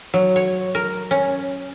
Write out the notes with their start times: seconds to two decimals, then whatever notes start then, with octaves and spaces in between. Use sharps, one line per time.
0.14 F#3
0.36 C#5
0.75 A#4
1.11 C#4